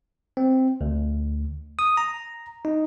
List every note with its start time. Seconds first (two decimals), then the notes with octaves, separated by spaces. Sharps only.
0.37 C4
0.81 D2
1.79 D#6
1.97 A#5
2.65 D#4